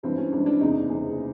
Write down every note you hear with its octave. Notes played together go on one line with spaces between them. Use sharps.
G#1 G2 E3 C4
C#4
G#1 G2 E3 D4
D4
F#1 E2 C3 D#4
F#1 E2 C3 G#4